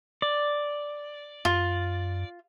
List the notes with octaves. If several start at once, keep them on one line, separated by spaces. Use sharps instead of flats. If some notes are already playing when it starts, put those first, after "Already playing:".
D5
F#2 F4